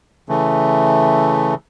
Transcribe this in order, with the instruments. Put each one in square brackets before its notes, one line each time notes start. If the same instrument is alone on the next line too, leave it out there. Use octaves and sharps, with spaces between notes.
[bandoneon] C#3 E3 A3